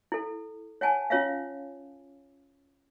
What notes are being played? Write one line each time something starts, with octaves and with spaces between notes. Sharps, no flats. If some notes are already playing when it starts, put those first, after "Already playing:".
E4 A4
C#5 F#5 G#5 A5
C#4 F4 C#5 E5 F5